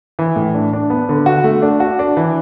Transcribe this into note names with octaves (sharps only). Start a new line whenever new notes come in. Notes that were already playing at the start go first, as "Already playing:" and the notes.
E3
A2
D4
D4
B3
D3
F#4
A3
D4
F#4
D4
E3